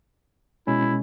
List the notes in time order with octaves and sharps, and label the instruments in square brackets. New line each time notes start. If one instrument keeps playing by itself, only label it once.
[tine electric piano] B2 G#3 C#4 [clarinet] E4